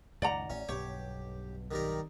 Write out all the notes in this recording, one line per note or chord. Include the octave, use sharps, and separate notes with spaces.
C#2 F#2 D#3 D5 F#5 A#5
A1 C#4
B1 G2 B2 G4 C#5
D#3 G3 A#4